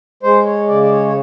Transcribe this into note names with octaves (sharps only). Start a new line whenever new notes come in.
G#3 C5
C#5
C#3 D5
D5
C#5
C#5